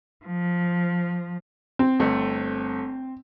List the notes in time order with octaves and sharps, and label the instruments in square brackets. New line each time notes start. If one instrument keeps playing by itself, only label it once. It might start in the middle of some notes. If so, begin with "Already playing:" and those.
[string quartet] F3
[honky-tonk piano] C4
[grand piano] G1 A3